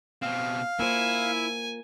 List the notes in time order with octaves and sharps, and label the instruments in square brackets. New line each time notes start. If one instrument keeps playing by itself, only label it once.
[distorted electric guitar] B2 C4 [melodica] F5
[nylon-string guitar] A#3 F4 C5 [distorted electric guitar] E4 [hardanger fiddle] G#5